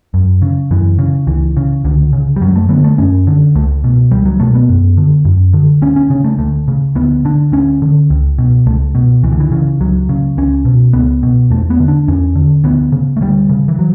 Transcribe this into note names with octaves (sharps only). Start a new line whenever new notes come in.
F#2
C#3
F#2 E3
C#3
C#2 E3
C#3
C#2 D3
C#3
G3
F#2 F#3
A3
D3 B3
A3
F#2 C#4
D3
C#2 A3
B2
C#2 G3
F#3
B2 A3
B3
F#2
D3
F#2
D3
D2 C#4
C#4
C#3 C#4
A3
D2 A3
C#3
D2 B3
D3 D4
D2 C#4
D3
C#2
B2
C#2 A3
B2
C#2 E3
D3
E3
C#3
C#2 F#3
C#3
C#2 C#4
B2
C#2 B3
B2
E2 A3
B3
D3
D4
E2 C#4
D3
D2 B3
C#3
A3
D2 G3
C#3
E3
F#3